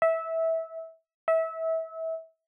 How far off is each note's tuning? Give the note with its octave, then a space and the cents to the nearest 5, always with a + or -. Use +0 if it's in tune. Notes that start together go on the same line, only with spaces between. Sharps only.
E5 -20
E5 -30